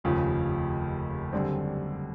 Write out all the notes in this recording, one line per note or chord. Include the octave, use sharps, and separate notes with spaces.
F1 D#2 C#3 F3
F#2 D3 G3 C4